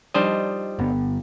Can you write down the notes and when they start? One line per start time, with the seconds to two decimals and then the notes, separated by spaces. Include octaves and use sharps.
0.14 F3 G3 D4 D#4 C5 D#5
0.79 G1 B3